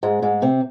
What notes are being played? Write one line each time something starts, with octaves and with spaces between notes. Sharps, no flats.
G#2 G#3
G#2 G#3
C3 C4